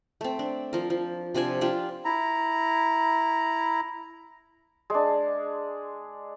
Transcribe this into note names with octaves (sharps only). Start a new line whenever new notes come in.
A3 C4
D4
F3 A#4
F3
C3 F3 D4 G#5
D4 F4 G4
E4 A#5
G#3 D4